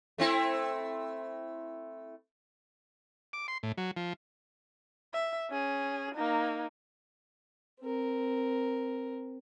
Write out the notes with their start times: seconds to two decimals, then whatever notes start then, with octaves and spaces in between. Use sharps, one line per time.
0.18 A3 C4 E4
3.33 D6
3.48 C6
3.63 A2
3.78 F#3
3.97 F3
5.14 E5
5.50 C#4 G#4
6.14 A#3 D#4
7.81 C4 A#4